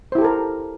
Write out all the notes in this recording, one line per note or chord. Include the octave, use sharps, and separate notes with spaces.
E4 G4 A4 A#4 C5